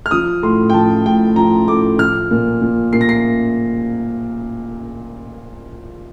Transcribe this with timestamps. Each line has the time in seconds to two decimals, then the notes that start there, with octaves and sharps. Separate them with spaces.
0.06 F6
0.11 F3 D#6
0.43 A2 C6
0.70 G5
0.74 F3 A5
1.06 A2 G5
1.36 F3 A#5
1.68 A2 D6
1.99 F3 F6
2.31 A#2
2.61 A#2
2.93 A#2 C7
3.01 A#6
3.09 C7